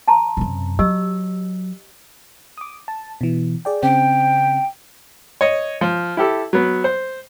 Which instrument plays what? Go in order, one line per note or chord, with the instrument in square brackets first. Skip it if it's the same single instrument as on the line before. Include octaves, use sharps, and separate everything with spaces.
[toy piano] A5 A#5 C6
[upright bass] F#2 C3
[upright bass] F#3 [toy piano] G4 D#5 E6
[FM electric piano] D6 D#6
A5
B2 E3
G#4 D5 G5
[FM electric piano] C#3 C4 [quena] G5
[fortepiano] C#5 D#5
F3
E4 G4 A4
F#3 B3
C5